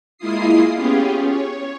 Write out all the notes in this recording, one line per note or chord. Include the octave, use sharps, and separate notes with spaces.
G#3 A#3 E4 F4 D#6 C7
B3 C#4 F4 G4 G#4
C#5